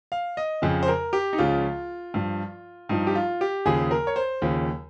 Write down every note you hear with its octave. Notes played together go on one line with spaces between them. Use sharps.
F5
D#5
F2 C#3 F3
C5
A#4
G4
D#4
C#2 C#3 F3 F4
G2 F3
G2 F3 D#4
G4
F4
G4
D#2 C#3 F3 G#4
A#4
C#5
C5
D#2 C#3 F3